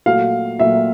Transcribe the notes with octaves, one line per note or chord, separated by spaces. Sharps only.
A#2 F#3 A3 F5
A#2 F#3 A3 E5